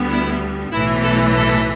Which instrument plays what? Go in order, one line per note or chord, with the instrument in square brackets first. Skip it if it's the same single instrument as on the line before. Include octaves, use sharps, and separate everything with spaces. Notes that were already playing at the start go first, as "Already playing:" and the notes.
Already playing: [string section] D2 D3 G3 B3
E4
B1 A2 E3 E4
A4
A4